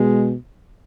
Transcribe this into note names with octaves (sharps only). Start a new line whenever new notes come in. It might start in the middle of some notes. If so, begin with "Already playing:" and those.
Already playing: B2 G#3